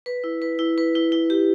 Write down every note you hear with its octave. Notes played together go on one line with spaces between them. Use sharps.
B4
E4
B4
E4
B4
E4
E4
G4